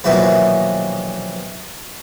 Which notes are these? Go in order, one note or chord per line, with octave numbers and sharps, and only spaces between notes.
A#1 B2 D#3 E3 F#3 B4